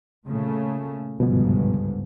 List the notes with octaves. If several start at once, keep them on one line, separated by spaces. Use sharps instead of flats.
A#2 C#3 A3
G1 C#2 G#2 B2 F3 B3